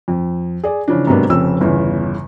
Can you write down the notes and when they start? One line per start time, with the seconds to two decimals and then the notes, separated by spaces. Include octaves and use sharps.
0.08 F2
0.64 G#4 D5
0.88 C#3 E3 F3 D4
1.07 G#2 C3 F#3 A#3 B3 D4
1.30 F1 F2 C#3 E6
1.61 G1 E2 C#3